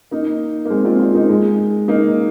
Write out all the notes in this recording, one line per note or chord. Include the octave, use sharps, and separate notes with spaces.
A#3 D#4
A#3
G#3 C4
C4 F4
C4 F4
A#3 D#4
G#3
A#3 D#4